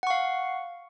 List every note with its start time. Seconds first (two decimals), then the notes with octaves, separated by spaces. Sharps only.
0.03 F#5
0.07 C#6
0.10 F5